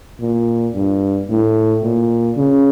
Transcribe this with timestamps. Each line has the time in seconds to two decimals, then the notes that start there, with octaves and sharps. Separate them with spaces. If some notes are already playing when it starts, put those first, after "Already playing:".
0.21 A#2
0.75 G2
1.29 A2
1.83 A#2
2.37 C#3